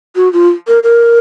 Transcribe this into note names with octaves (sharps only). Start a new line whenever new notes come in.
F#4
F4
A#4
A#4